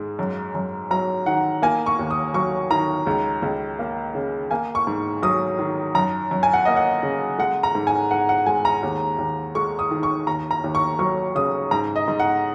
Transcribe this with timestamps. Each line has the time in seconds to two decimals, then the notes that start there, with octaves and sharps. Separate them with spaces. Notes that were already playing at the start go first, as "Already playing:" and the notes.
Already playing: G#2 G#3
0.19 F#2
0.55 F#2
0.91 F#3 A#5
1.26 D#3 F#5
1.62 A#3 G#5
1.86 C#6
1.99 D#2
2.11 D#6
2.34 F#3 C#6
2.71 D#3 A#5
3.07 C#2
3.42 C#2
3.79 A#3
4.15 C#3
4.51 A#3 G#5
4.75 C#6
4.87 G#2
5.23 F#3 D#6
5.59 D#3
5.95 F#2 A#5
6.31 F#2
6.43 G#5
6.53 F#5
6.65 A#3 D#5
6.76 F#5
7.03 C#3
7.38 G#3 F#5
7.63 A#5
7.75 G#2
7.87 G#5
8.11 G#2 F#5
8.29 F#5
8.46 G#3 G#5
8.65 A#5
8.83 D#2
9.19 D#2
9.55 G#3 C#6
9.79 D#6
9.91 D#3
10.03 C#6
10.27 D#2 A#5
10.51 A#5
10.64 D#2
10.75 C#6
10.99 F#3 C#6
11.35 C#3 D#6
11.71 G#2 A#5
11.96 D#5
12.08 G#2
12.20 F#5